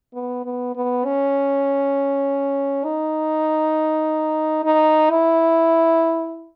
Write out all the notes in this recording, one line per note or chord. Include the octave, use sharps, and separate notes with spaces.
B3
B3
B3
C#4
D#4
D#4
E4